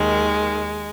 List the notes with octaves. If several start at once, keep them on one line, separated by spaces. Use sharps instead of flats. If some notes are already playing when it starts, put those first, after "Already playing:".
Already playing: D#2 D#3 G#3